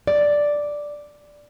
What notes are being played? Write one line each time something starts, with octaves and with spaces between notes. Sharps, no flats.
D5